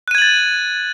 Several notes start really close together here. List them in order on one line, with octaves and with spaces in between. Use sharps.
F#6 D#7 G#6 F#7 A6